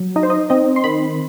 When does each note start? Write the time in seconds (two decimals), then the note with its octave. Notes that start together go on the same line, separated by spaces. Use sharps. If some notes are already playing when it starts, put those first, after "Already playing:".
Already playing: F#3
0.16 D#4 D#5
0.23 C5
0.30 D#5
0.50 C4 D#5
0.76 C6
0.84 D#3 B5